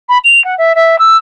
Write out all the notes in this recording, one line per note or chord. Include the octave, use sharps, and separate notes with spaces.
B5
F7
F#5
E5
E5
E6